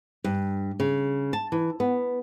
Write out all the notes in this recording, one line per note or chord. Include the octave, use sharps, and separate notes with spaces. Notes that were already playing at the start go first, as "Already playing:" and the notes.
G2
C#3
A5
E3
B3